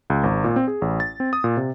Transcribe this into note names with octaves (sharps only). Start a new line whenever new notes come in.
C#2
G#1
A#2
C4
G#4
A1
A6
C4
D#6
A#2
C3